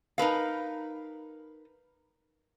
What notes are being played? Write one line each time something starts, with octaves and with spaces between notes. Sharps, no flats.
D#4 A#4 B4 F5